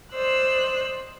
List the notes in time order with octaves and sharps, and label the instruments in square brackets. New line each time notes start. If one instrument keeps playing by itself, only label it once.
[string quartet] C5 D5 D#5 E6 F#6